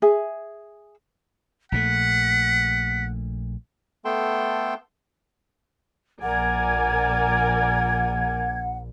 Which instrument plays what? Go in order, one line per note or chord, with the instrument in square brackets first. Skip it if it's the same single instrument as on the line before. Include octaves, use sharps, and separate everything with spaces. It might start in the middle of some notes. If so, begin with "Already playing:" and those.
[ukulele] G#4 E5
[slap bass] A#1 A#2 A3 [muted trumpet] F#5 [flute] B6
[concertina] A3 B3 A4 G5 A5 C6
[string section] A#1 [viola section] A#4 D5 G#5 [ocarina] F#5 [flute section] G#6